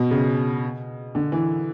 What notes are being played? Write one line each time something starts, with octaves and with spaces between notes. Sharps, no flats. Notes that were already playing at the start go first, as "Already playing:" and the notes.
Already playing: B2
C#3
D3
E3